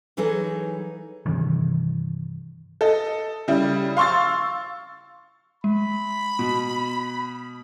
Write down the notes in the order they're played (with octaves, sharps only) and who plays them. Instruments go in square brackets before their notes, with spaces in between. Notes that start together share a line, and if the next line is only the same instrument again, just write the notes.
[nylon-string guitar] E3 F#3 D#4 G#4 A4 B4
[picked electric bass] G2 C3 D#3 E3
[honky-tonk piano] A4 D#5
C#3 G3 E4
F5 C6 C#6 E6 A6
[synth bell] G#3 [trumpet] B5
[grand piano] B2